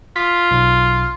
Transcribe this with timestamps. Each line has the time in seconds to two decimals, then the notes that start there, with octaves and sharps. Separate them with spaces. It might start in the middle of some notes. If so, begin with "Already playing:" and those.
0.16 F4 B6
0.51 B1